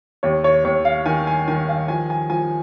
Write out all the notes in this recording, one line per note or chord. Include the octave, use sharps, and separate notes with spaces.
D#2 C#5
C#5
D#2 C#5
F5
D#3 G#5
G#5
D#3 G#5
F5
F3 G#5
G#5
F3 G#5